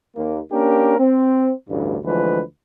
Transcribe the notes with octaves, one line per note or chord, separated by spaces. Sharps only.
D#2 A#3
A#3 C#4 D4 G4 A#4
C4
A1 D2 G2
D2 E3 F3 G#3 B4